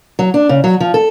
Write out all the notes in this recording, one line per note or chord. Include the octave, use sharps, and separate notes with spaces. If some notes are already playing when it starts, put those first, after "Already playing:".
F#3
D4
C#3
F#3
F3
A4